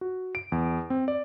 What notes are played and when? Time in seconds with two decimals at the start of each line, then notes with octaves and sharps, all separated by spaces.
0.01 F#4
0.35 D7
0.52 E2
0.90 C4
1.08 D5